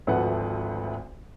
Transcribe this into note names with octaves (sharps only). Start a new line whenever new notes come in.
G#1 D2 F3 A3 B4 F#5